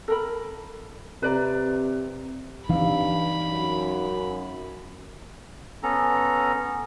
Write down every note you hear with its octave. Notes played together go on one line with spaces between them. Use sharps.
A4 A#4 B5
C3 B4 D5 A#5
G2 E3 C4 D#4 F5 B5
F#2
B3 C#4 A4 A#5